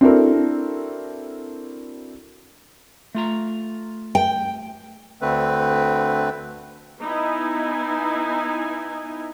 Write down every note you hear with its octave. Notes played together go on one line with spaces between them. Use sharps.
C4 D4 E4 F#4 A4 A#4
A3 F4 A#5
G5
D2 D3 A3 C4 B4
B3 D#4 E4 G#5